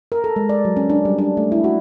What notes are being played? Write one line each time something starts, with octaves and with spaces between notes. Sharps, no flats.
A#4
A4
G#3
D5
F#3
C#4
D4
G3
D4
A3
E4
F#4